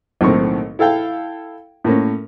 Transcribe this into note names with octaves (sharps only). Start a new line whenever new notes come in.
B1 A2 D#3 A#3 C4 C#6
E4 A4 F5 G5
A2 A#3 C#4